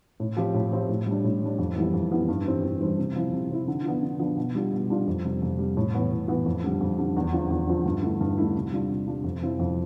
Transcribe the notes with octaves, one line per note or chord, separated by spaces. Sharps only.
A2
F3 C4 G4
A2
F3 C4 G4
A2
G3 D4
A2
G3 D4
F2
E3 G3 B3 E4
F2
E3 G3 B3 E4
G2
E3 G3 C4 G4
G2
E3 G3 C4 G4
C3
F3 C4 E4
C3
F3 C4 E4
D3
F3 B3 D4 F4
D3
F3 B3 D4 F4
B2
G3 D4 F4
B2
G3 D4 F4
F2
C3 G3
F2
C3 G3
A2
E3 B3
A2
E3 B3
F2
D3 G3
F2
D3 G3
E2
D3 F3 C4 F4
E2
D3 F3 C4 F4
G2
D3 A3 E4
G2
D3 A3 E4
C3
G3 D4 F4
C3
G3 D4 F4
F2
C3 F3 C4 E4
F2